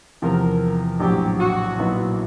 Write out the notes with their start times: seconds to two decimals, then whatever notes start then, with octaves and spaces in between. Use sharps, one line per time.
0.22 E2 C3 F3 A#4
1.00 A#1 A2 F#3 G4
1.39 F#4
1.78 B1 A#2 F#3 B3 E4